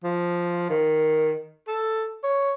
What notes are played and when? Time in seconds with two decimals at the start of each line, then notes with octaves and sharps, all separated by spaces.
0.04 F3
0.70 D#3
1.67 A4
2.23 C#5